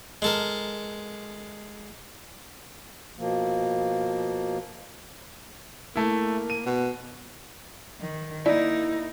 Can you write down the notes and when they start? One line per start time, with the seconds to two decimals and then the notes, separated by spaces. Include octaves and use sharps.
0.22 G#3 A4 A#4
3.18 B2 F3 A#3
5.96 A3 A#3 E4
6.50 D#7
6.66 B2
8.01 D#3
8.46 A#3 D#4 E4 D5